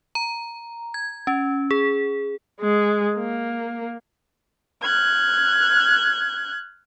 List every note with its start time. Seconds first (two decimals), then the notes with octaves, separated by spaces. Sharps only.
0.15 A#5
0.94 G#6
1.27 C#4
1.71 G#4
2.61 G#3
3.18 A#3
4.83 F6 F#6 G#6